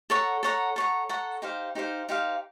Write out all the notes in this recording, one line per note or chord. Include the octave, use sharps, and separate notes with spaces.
A4 C#5 F#5 A#5
A4 C#5 F#5 A#5
A4 C#5 F#5 A#5
A4 C#5 F#5 A#5
D#4 G4 C5 F5
D#4 G4 C5 F5
D#4 G4 C5 F5